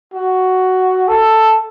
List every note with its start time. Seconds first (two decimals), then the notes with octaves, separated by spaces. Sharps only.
0.14 F#4
1.08 A4